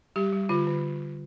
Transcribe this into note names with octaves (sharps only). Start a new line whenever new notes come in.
G3 G4
G3
D3 F4
D3